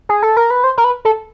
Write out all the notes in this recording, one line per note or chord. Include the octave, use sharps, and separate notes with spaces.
G#4
A4
A#4
B4
C5
A#4
B4
A4